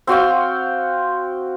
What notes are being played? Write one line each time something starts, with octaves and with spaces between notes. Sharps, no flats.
C4 F#4 F5 G5